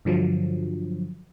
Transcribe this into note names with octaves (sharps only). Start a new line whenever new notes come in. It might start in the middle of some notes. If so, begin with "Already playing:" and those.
G2 D3 F3 F#3